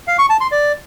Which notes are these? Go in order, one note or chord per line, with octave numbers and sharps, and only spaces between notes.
F5
C#6
A5
C6
D5